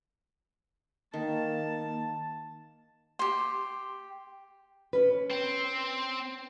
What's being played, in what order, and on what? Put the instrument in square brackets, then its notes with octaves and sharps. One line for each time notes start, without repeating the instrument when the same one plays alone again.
[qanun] D#3 [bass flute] A#3 [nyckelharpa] A5
[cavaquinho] G4 C6
[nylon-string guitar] C#4 B4
[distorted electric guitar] C4